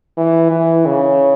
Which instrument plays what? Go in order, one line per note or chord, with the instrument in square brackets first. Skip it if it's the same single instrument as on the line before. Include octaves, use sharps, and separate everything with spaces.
[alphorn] E3
E3
C#3